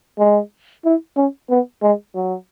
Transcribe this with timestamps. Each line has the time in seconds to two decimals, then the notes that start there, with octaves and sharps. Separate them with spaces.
0.19 G#3
0.85 E4
1.16 C#4
1.50 B3
1.82 G#3
2.15 F#3